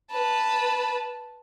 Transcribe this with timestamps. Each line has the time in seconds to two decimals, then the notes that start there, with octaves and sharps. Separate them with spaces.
0.12 B4 A5